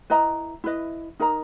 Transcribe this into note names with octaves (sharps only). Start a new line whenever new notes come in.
E4 B4 D#5 A#5
E4 B4 D#5
D#4 A#4 D#5 A#5